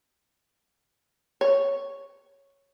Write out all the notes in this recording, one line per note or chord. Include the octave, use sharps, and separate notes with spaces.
C#5